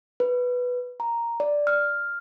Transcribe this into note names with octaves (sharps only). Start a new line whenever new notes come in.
B4
A#5
D5
F6